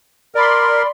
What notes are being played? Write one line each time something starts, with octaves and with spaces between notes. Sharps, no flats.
A#4 D5 B5 C6